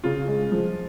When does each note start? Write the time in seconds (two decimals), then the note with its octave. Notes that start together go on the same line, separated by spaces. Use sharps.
0.04 C#3 F4
0.28 G#3
0.52 F3